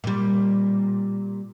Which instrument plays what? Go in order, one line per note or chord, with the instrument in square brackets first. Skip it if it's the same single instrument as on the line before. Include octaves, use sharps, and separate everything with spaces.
[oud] A#2 G3